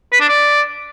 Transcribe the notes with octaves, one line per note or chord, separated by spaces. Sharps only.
B4
D4
D5